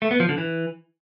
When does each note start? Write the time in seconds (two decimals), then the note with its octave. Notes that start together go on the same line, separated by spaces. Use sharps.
0.02 A3
0.11 B3
0.20 F3
0.29 D3
0.38 E3